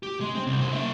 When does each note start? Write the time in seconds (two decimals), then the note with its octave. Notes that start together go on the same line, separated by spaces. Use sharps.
0.03 G4
0.21 G#3
0.35 C4
0.46 C2
0.61 C3 G#3
0.73 A#3 E5